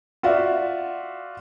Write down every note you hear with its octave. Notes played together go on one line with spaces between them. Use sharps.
F4 F#4 D5 E5